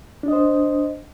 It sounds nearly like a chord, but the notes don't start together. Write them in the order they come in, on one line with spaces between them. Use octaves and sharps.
D4 D#5 C5